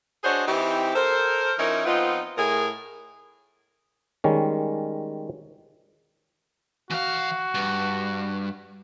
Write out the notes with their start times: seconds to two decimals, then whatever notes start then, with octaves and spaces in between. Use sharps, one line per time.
0.24 D4 F#4 G#4 C5 C#5 D#5
0.47 E3 C4 D#4 E4 G4
0.95 A4 A#4 C5
1.58 F3 C#4 D#4 E4 A#4
1.85 F3 B3 C4 D#4 F4
2.37 A2 G#4 A#4
4.24 D#3 G3 G#3 C#4
6.90 E3 F#4 F5
7.55 G2